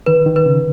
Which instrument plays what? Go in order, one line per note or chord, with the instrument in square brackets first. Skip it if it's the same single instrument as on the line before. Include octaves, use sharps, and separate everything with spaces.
[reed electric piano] D#3 [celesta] B4
[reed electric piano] D#3
[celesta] B4
[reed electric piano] C#3